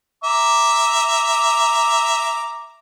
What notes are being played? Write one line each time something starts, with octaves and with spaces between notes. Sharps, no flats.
E5 A#5 D6